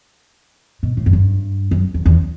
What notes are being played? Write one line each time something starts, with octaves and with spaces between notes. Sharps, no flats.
B2
A2
F#2
G2
F#2
E2
E2